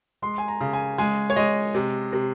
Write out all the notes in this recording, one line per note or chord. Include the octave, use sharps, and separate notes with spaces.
G#3 C6
G#5
A#5
C#3
G#5
G#3 G#5
C#5
G#3 D#5
C3
C3